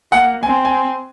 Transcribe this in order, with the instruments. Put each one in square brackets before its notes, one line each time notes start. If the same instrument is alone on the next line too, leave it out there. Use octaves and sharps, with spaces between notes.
[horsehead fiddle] A#3 [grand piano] F#5
[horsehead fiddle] C4 [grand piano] G#5
[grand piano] G#5